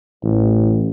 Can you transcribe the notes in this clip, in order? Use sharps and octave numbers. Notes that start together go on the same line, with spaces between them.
A1